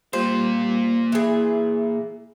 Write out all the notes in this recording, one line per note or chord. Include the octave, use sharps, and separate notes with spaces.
A#2 G3 A#3 F4 G4 C5 F5
E3 G#4 E5